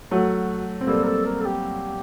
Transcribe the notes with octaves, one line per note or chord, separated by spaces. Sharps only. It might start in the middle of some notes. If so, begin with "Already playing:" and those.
F#3 A3 F#4
C4
G3 A#3 A4
A#4
A4
A#4
A4
G4